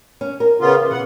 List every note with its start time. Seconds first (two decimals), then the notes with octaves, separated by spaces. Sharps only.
0.21 C#4
0.40 A#4
0.60 C#3 B3 F4
0.79 E3
0.91 B2 F#5